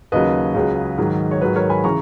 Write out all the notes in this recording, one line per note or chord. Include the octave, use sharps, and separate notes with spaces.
D#2 C#3 F#3 B4 D#5
C#2 C#3 F#3
G#2 D#3 F#3
C#5
G#2 D#3 F#3 B4
A#4 C#5
G#5 B5
C#3 E3 A#5 C#6